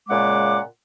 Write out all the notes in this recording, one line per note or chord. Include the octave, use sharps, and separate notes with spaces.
A#2 C#3 G#3 F#5 D6